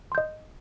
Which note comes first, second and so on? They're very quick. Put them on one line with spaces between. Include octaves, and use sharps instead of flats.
C6 G6 D#5